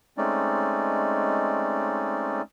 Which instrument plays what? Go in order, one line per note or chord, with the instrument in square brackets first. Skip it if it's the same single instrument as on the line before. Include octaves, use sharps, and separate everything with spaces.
[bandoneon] G#3 A3 C4 C#4 D#4 D5